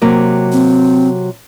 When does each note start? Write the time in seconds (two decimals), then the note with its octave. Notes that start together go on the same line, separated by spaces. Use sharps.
0.02 C3 F#3 A#3
0.52 C4